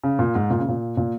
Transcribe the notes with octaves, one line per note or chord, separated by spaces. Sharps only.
C#3
A#2
G#2
A#2
C#3
A#2
A#2